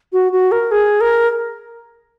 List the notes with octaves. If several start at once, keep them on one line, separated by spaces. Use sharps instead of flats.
F#4
F#4
A#4
G#4
A#4